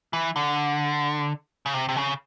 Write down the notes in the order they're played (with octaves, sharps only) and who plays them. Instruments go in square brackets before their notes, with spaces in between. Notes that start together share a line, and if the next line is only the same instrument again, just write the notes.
[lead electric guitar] E3
D3
C#3
C3
C3
C#3